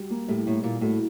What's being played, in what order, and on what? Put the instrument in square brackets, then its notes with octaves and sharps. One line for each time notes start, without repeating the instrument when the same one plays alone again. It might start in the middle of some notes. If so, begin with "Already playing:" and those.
Already playing: [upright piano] G3 F#4
A#3
[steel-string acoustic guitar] A2 [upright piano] G3
[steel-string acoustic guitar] A2 [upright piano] A#3
[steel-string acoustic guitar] A#2 [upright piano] A#3
[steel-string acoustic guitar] A2 [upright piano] F#4